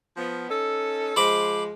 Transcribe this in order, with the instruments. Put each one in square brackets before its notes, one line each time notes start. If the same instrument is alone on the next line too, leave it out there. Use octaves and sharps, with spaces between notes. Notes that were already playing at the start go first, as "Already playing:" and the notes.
[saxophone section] F3 B3
C#4 D#4 A4
[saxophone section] F3 G#3 [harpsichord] C5 B5 D6